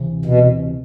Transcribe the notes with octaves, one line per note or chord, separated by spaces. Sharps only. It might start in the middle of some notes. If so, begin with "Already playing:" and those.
Already playing: D2 C3 E3
B2